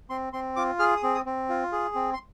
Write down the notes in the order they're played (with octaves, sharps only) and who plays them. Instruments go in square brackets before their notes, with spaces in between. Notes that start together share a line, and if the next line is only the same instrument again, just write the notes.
[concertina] C4 C6
C4 C6
F4 D6
G#4 F6
D#6
C4
D#6
C4
F4
G#4
C4
C6